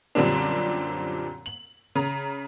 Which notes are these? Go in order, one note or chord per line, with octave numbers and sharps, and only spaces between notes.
F#2 A#2 D3 G3 C4 D4
F#7
C#3 A#5